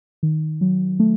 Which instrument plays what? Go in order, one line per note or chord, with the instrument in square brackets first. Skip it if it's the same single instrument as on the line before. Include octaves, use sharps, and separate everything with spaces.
[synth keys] D#3
F#3
A3